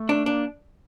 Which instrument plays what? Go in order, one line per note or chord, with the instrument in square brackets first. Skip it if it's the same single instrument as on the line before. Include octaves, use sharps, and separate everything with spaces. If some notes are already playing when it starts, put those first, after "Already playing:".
Already playing: [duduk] A3
[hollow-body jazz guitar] D4
[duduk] A#3 [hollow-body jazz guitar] D4